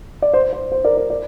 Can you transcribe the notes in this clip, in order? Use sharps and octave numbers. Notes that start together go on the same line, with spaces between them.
D5
C5
C5
C5
A#4 D5
A#4 D5
A#4 D5